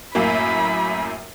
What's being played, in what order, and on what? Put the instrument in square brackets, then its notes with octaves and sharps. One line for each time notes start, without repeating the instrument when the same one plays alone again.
[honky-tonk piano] F#2 A2 A#3 [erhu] B5